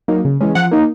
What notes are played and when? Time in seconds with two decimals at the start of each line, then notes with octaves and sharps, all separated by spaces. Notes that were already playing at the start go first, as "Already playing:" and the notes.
0.08 F#3 A#3 D#4
0.25 C#3
0.40 E3 G#3 C#4
0.55 F3 F#5
0.71 A#3 D#4